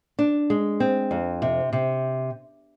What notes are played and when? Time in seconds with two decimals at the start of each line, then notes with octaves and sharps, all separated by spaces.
0.19 D4
0.50 G#3
0.80 C4
1.11 F2
1.42 C3
1.73 C3